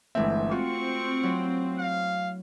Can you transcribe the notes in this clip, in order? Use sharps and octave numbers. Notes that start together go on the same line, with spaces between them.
G1 E3 G#3 A3 C4 E5
C4 F4 F#4 C#6
F#3 E4
F5